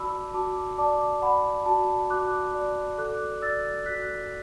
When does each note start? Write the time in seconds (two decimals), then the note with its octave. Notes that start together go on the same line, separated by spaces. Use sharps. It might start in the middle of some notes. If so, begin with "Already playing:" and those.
Already playing: F#4 D5 A5 B5 D6 E6
0.34 F#4 A5 D6
0.78 D5 A5 D6
1.22 D5 F#5 B5
1.66 F#4 A5
2.10 F#4 D6 F#6
2.54 D5
2.98 A4 D6 F#6
3.42 D5 E6 A6
3.86 F#4 F#6 B6